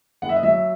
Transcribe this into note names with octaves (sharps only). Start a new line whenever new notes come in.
F#1 F#5
E5
D#5
F#3 E5